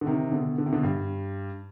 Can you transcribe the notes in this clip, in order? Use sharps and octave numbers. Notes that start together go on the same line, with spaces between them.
D3
C3 D#3
B2 D3
D3
C3
B2 D3
G2